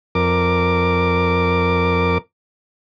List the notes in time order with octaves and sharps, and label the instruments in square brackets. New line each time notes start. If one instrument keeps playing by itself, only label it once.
[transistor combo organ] F2 A#4 D6